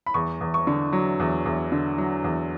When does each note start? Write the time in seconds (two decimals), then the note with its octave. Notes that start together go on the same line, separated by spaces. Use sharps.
0.06 B5
0.14 E2 C#6
0.41 E2
0.54 C#6
0.67 D3
0.93 F#3
1.20 E2
1.46 E2
1.72 D3
1.98 F#3
2.24 E2